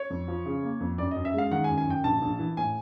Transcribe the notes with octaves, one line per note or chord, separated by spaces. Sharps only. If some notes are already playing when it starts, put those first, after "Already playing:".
Already playing: C#5
F2
F3
C#3
A#3
F2
F#2 D5
F#2 D#5
E5
G#3 F5
D#3 F#5
G#5
F#2
G#5
F#2 G5
A#1 A5
A#1
E3
A2 G#5